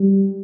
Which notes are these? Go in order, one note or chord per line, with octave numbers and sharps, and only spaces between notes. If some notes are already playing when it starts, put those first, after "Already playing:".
Already playing: G3